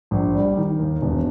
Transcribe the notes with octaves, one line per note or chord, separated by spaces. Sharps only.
A#1
G3
D#3
D#2
E1